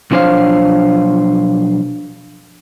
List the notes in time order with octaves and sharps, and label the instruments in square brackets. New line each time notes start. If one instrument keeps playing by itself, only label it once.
[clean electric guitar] B1 F3 D4 C5 C#5 F5